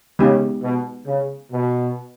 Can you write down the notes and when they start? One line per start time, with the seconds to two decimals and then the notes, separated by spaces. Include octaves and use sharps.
0.19 C#3 G#3 B3 D#4 G4
0.63 B2
1.07 C#3
1.50 B2